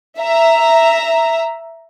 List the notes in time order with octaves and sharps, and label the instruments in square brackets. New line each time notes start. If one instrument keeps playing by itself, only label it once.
[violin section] E5 A#5